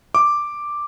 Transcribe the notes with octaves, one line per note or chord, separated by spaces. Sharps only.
D6